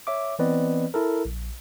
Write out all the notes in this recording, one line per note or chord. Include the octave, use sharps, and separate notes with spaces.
C#5 E5 D6
E3 B3 C4 B4 D5 D#5
E4 A4 A#4
A#1